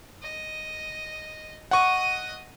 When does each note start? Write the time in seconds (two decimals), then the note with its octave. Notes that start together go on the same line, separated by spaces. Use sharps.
0.22 D#5
1.71 D#5 F#5 C#6 D#6